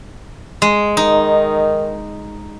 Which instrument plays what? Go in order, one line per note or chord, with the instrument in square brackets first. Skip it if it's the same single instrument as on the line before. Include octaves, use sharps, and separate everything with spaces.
[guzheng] G#3
[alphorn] D#3 [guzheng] D#4